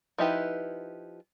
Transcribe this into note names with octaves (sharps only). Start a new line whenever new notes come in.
F3 D#4 E4 G4 B4